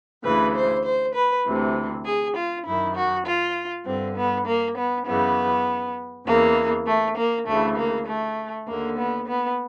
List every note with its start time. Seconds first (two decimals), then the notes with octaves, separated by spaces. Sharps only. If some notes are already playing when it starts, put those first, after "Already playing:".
0.24 D2 C#3 E3 B4
0.55 C5
0.84 C5
1.14 B4
1.45 D2 C3 E3
2.05 G#4
2.36 F4
2.65 F#2 D#3 E4
2.95 F#4
3.25 F4
3.85 G2 D3 C4
4.16 B3
4.46 A#3
4.76 B3
5.05 F#2 C#3 E3 B3
6.26 E2 C#3 E3 A#3
6.86 A3
7.16 A#3
7.46 D2 C#3 E3 A3
7.77 A#3
8.07 A3
8.67 D#2 D3 A#3
8.98 B3
9.27 B3